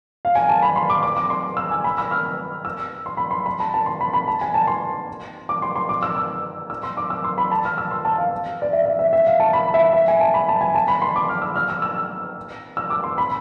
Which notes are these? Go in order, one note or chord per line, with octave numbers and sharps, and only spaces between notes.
F5
G#5
A5
B5
C6
D6
D6
D6
C6
E6
G#5
B5
E6
F6
E6
C6
B5
C6
B5
A5
A5
C6
B5
B5
A5
G#5
A5
C6
D6
C6
C6
D6
E6
D6
E6
C6
D6
E6
C6
B5
A5
F6
E6
C6
A5
F5
D5
E5
E5
E5
E5
F5
A5
B5
E5
E5
G#5
A5
B5
A5
G#5
A5
B5
C6
D6
F6
E6
F6
E6
E6
E6
D6
C6
B5